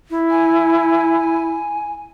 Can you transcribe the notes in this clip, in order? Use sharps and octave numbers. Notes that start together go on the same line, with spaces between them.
E4
G#5